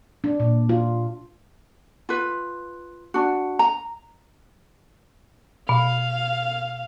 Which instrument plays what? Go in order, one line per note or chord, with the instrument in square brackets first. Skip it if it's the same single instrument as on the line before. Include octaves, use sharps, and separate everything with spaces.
[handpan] D4
A#2
F4
[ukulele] F4 B4
D4 F#4
A#5
[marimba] B2 [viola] F5